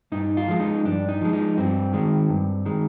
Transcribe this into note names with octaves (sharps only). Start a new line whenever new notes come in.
G2 D#4
F4
F3 G#3
D#4
G2 D4
D#4
F3 G#3
D#4
G2 C4
D#3 G#3
G2
D#3 G#3